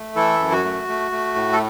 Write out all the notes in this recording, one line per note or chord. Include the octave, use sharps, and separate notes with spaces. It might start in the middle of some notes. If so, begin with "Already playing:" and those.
Already playing: A3
E3 E4 A4
F#2
F#4
A3
A3
A3
A2
A4